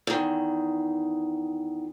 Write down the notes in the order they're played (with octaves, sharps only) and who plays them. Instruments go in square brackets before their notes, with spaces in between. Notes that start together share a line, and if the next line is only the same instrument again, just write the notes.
[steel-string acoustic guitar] E2 D#3